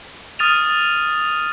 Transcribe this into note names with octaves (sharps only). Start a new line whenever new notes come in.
D#6 F6 A6 D#7 F7